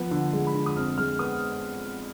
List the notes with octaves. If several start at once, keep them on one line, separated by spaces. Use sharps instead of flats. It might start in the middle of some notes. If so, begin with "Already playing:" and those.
Already playing: F3 B3
D3
G#3
B5
D3
D#6
F2 F6
G#3 F6
B3 D#6